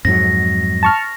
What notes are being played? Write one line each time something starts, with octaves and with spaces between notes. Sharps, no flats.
F2 G#2 F#3 A#6
A5 C#6 F6